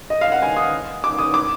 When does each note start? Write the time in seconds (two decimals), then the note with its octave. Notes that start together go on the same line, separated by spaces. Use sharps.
0.10 D#5
0.21 F5
0.32 F#5
0.42 G#5
0.57 D#6
1.04 D6
1.19 D#6
1.34 D6